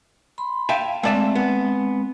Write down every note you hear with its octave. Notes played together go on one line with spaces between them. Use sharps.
B5 C6
E5 F5 G5 A5
G#3 A3 C4 D5 E5
B3